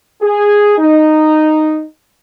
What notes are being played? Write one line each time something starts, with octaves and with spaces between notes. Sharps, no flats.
G#4
D#4